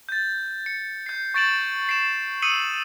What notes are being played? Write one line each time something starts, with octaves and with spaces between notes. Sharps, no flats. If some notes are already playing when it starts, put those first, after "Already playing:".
G6 A6
C#7
G6 C7
C#6 G6 A6 D7 E7 F#7
C7 D7 E7
D#6 E6 C7 C#7 D#7 F#7